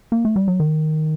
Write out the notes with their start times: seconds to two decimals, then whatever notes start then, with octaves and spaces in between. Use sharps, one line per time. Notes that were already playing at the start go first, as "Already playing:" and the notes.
0.12 A#3
0.25 A3
0.36 G3
0.48 F#3
0.60 D#3